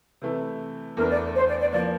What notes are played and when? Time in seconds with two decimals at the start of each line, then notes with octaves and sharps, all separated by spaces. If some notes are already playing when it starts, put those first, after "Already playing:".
0.22 C3 E3 A3
0.96 E2 E3 A3 D4 A#4
1.09 D5
1.35 C5
1.48 D5
1.60 D5
1.72 F3 A#3 D5